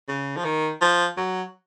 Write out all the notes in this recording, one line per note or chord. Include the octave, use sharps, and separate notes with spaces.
C#3
F3
D#3
F3
F#3